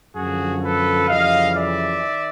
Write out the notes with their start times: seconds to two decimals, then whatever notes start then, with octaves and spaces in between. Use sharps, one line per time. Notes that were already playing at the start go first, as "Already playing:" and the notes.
0.14 F#2 D3 F3 F#4 G#4
0.62 A4 B4
1.08 F2 C#3 E3 G3 D#5 F5
1.55 D5 E5
2.02 D#3